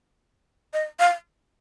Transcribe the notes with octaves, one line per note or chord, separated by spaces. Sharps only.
D#5
F5